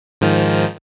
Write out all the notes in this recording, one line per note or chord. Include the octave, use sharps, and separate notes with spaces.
G#2 D#3 F3